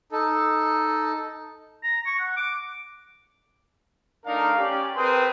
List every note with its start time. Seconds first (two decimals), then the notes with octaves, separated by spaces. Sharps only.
0.12 D#4 A4
1.83 A#5
2.06 C#6
2.19 F#5
2.37 D6
4.26 A3 D4 D#4 A#4 F5
4.58 C#4 G4 D5
4.96 C4 G#4 A#4 B4 C6 D#6